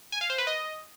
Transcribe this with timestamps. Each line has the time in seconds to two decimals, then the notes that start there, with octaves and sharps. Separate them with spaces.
0.12 G#5
0.21 F5
0.30 C5
0.38 B4
0.47 D#5